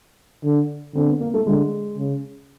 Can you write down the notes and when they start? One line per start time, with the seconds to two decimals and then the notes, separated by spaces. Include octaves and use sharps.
0.44 D3
0.95 D3 C4
1.07 B3
1.20 A#3
1.34 A3
1.47 D3 G#3
1.98 C#3